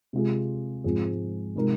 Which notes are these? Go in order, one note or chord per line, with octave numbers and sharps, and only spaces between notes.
C3 G#3 F4 G#4
G#2 F3 C4 G#4
C3 F3 G#3 D#4 A#4